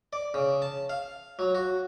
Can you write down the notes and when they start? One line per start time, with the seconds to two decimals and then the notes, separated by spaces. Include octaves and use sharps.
0.13 D5
0.34 C#3
0.62 A5
0.90 F5
1.39 F#3
1.55 F#4